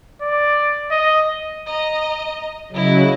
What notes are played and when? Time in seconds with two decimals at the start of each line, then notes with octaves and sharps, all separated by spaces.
0.22 D5
0.91 D#5
1.64 D#5 A#5
2.72 C#3 F#3 E4 D#5